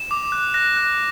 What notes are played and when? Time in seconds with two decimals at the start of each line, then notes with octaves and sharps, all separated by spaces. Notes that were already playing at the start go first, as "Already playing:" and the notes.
Already playing: E7
0.11 D6
0.32 F#6
0.54 F#6 A#6
0.77 F#6